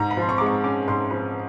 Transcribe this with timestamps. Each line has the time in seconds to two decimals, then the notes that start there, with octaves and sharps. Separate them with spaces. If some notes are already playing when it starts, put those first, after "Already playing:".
Already playing: G#2 A#5
0.11 B5
0.17 F3 C6
0.29 C#6
0.38 G#3 D6
0.46 C#6
0.64 C#4 D6
0.88 G#2 C6
1.11 F3 B5